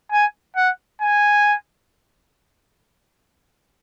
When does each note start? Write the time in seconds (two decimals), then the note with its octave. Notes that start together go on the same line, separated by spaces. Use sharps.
0.12 G#5
0.57 F#5
1.02 G#5